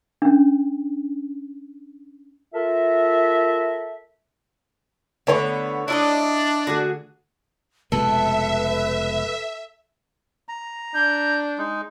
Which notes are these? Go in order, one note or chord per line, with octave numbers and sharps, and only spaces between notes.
C#4 D4
F4 A4 A#4 E5
D3 A3 B3 C#5 E7
D4 E4 D5 D#5
D3 A3 F#4 G#4
F1 B2 G#3 A4 B4 E5
A#5
D4 G6
G#3 D#4